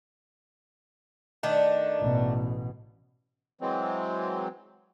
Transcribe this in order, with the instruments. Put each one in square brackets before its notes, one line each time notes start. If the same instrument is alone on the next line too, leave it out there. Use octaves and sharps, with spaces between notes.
[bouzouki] D#3 A3 D4
[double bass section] A1 B2
[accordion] E3 F#3 G#3 C4